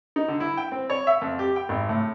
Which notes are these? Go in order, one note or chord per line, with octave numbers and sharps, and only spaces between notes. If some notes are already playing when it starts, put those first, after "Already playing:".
D#4
D3
E4
G5
C4
C#5
E5
F2
G4
G5
G#1
A2